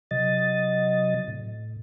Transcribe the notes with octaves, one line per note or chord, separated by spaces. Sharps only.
C3 F#3 D#5 A6
A2